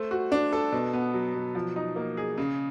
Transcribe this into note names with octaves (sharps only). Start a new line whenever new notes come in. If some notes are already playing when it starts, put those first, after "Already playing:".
Already playing: A3 C5
F#4
D4
A4
B2
B3
F#3
B2
F3
D#4
A#3
G#4
C#3